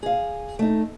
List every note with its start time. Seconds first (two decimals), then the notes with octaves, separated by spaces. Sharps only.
0.03 G#4 F5
0.59 A3 D#4